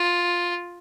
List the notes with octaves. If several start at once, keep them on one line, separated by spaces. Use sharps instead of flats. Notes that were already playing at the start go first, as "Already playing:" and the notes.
Already playing: F4